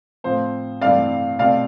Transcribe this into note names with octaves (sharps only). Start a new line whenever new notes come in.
A2 F3 C4 C5
G2 E3 A3 C4 D5 F5
B2 A3 C4 D5 F5